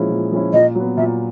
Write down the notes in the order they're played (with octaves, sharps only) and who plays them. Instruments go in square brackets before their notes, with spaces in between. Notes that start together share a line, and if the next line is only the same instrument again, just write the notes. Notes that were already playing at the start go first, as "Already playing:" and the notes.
Already playing: [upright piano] A#2 F3 G#3 C#4 E4
A#2
F3 G#3 C#4 E4
[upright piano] A#2 [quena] D#5
[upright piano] F#3
B3
[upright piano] A#2 [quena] E5